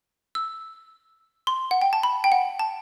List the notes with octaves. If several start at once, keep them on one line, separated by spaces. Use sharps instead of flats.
E6
C6
F#5
G5
A5
B5
G5
F#5
A5